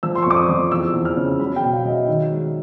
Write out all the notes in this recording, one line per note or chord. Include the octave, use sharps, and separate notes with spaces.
F3 E6
C6
C#6
F2 D6
D#6
F3
E2 E6
E2
F6
C#3
F#3 B5
G5
B2
F5
F#3 D#5
E5
D#3
G#3